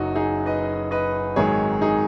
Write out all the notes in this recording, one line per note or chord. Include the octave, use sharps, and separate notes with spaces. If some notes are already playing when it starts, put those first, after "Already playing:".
Already playing: F#1 F#2 F#3 D#4 F#4
D#4 G#4
B4 D#5
B4 D#5
G#1 G#2 D#3 F#3 G#4 C#5
D#4 G#4